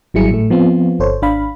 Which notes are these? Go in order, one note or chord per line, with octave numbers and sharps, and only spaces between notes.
G#1 F#3 G3 E4 G#4 C#7
A2 A3
F3 B3 C4 F4
G1 A4 C5 C#5
G#1 D4 F5 B5